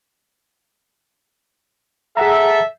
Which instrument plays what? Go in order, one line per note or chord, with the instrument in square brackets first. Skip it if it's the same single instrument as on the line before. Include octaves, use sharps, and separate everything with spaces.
[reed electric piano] G#4 F#5 A#5 [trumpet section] A4 E5